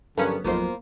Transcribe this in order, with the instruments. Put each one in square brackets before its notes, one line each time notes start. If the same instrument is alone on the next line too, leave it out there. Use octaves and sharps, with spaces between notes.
[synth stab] G2 F3 C#4 [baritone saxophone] D3 [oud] F#3 B3 [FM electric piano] A4 A#4
[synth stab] G#1 F2 [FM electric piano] F3 F#3 [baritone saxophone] A#3 [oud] B3 F4 C5